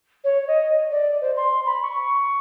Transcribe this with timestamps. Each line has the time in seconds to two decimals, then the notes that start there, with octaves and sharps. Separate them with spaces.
0.24 C#5
0.48 D#5
0.90 D5
1.21 C5
1.36 C6
1.66 B5
1.82 C#6